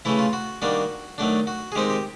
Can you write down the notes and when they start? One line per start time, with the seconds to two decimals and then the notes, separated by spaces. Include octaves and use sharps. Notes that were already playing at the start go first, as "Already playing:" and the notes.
0.05 C#3 E3 A3 E4
0.19 F4
0.33 F#4
0.62 D#3 G3 A#3 D4 F#4
1.18 D#3 F#3 A3 D4
1.47 F#4
1.72 G#4
1.75 D#3 G#3 C4 D#4 G4
1.90 G4